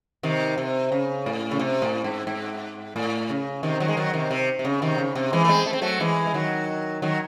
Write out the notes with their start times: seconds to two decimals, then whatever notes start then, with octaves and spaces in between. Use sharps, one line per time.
0.23 C3 D#3
0.58 C3
0.92 C#3
1.26 A2
1.51 C#3
1.59 C3
1.82 A2
2.04 G#2
2.27 G#2
2.96 A2
3.29 C#3
3.63 C3 D#3
3.80 D#3 F#3
3.88 G#3
3.97 D#3 F#3
4.13 C3 D#3
4.31 C3
4.59 C3
4.65 C#3
4.82 C3 D#3
4.98 C#3
5.15 C3
5.33 E3 G#3
5.44 A3
5.49 G#3 C4
5.66 A3
5.73 C4
5.81 F#3 A3
6.00 E3 G#3
6.27 G#3
6.34 D#3 F#3
7.02 D#3 F#3